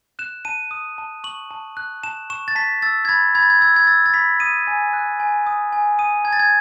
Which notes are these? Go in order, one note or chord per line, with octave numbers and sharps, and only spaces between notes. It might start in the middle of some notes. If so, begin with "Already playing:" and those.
F#6 E7
A5 D#7
D#6
A5
C#6 F#7
A5
F#6
A5 E7
C#6 E7
A6
A5 B6
E6 A6
G#6
B5 A6
B5 G#6
A6
G#6
E6 G#6
G#6
E6 A6
A6
B5 B6
D#6 D#7
G#5
F#6
G#5
D#6
G#5
D#6 D#7
A5 G#6
A6
G#6